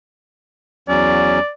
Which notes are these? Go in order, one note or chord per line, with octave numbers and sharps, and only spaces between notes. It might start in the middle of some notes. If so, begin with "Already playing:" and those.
E2 F#3 C#4 D5